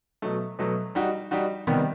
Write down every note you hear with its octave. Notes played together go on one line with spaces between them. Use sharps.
B2 F#3 A3
B2 F#3 A3
G3 D#4 F#4
G3 D#4 F#4
C3 D#3 G3 B3